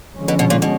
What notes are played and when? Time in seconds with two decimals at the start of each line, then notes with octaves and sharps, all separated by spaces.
0.17 D3 F3 G#3 C#4
0.28 B2
0.39 B2
0.50 A#2
0.62 B2